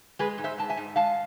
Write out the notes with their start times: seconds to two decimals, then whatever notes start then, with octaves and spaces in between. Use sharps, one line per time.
0.19 G#3 G#4 B4
0.38 G#2
0.44 C5 E5
0.58 G#2 A5
0.70 E5 G#5
0.77 G#2
0.96 G#3 F5 A5